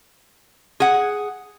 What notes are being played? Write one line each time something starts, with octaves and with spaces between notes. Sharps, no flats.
G#4 F#5